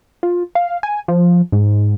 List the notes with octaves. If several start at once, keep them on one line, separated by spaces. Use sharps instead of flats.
F4
F5
G#5
F3
G#2